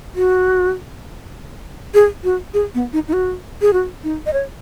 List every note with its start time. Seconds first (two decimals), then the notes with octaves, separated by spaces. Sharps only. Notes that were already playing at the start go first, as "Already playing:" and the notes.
0.15 F#4
1.94 G#4
2.24 F#4
2.54 G#4
2.74 B3
2.93 D#4
3.08 D#4
3.13 F#4
3.61 G#4
3.73 F#4
4.04 D#4
4.26 D#5
4.33 C#5